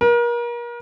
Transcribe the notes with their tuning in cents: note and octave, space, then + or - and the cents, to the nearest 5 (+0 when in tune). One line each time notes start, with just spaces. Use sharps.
A#4 +35